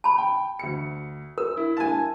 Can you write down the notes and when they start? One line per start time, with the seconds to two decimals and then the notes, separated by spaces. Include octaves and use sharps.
0.04 A5 B5
0.18 G5
0.59 D2 C#7
1.38 A#4 E6
1.57 E4
1.77 G#5 A5